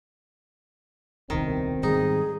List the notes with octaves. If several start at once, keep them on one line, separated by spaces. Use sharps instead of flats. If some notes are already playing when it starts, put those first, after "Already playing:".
D#1 C2 B2 D3 D#3 C4
G#2 D#3 G3 D#4 G#4